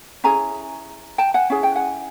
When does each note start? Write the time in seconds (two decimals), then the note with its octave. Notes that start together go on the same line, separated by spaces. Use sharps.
0.24 C#4 E4 G#4 G#5 A#5
1.18 G5 A5
1.34 F#5 G#5
1.50 C#4 E4 G#4 G#5
1.63 G5
1.76 F#5 G#5